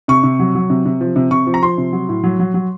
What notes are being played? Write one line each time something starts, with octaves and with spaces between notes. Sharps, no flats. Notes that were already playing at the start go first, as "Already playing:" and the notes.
C3 C#6
C3
F#3
F#3
C3
C3
F3
C3
C3 C#6
F3
A#5
F3 C6
C3
F#3
A2
F#3
F#3
F#3